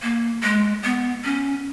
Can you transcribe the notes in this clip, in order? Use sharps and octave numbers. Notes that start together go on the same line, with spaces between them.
A#3
G#3
B3
C#4